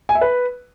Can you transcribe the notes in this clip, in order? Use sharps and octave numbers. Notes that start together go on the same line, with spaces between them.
G#5
E5
B4